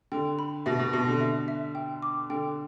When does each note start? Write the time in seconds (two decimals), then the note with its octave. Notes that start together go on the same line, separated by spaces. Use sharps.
0.12 D3 G5
0.39 B5
0.66 B2 E5
0.79 B2
0.93 B2 A5
1.07 D3
1.20 E5
1.48 E5
1.75 G5
2.02 D6
2.30 D3 G5